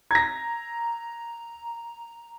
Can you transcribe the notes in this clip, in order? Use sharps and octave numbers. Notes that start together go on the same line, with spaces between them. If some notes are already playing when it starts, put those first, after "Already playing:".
A#5 G#6 A#6